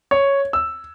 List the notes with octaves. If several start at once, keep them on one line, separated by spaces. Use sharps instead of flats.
C#5
E6